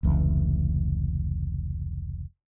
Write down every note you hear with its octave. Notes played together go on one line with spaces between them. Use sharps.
F1 C#2 E3